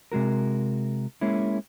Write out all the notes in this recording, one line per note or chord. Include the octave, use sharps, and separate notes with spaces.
C3 G#3 F#4 A#4
G#3 A#3 C#4 E4